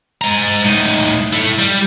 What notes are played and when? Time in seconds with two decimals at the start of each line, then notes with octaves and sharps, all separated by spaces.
0.21 G#3 A#5
0.65 A2 D#4
1.33 E4 A4
1.59 G3